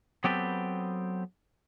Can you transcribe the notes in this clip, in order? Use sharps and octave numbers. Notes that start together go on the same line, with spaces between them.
F#3 B3 C4 G4 A4 B4